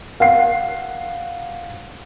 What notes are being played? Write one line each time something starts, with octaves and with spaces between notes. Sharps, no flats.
F5 F#5 C7